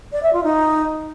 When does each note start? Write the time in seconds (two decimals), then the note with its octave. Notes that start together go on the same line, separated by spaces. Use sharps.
0.12 D5
0.23 E5
0.33 F4
0.43 D#4